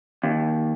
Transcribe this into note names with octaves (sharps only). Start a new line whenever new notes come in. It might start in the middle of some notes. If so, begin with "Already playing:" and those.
D#2